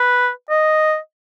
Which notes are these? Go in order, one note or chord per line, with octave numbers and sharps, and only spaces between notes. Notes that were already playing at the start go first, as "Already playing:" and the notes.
Already playing: B4
D#5